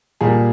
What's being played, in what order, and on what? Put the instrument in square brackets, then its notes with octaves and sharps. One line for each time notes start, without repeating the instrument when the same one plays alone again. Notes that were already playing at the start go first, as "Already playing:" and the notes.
[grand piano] A#2 G3 G#4